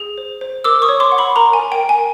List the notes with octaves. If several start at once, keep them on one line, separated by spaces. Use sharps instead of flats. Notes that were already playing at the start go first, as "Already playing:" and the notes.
Already playing: G#4
C5
C5
A#4 D6 E6
C#6 D#6
C#5
C6 D6
F#5
B5 C#6
A#4 A#5 C6
G#5
A#4
G5
A#4
G#5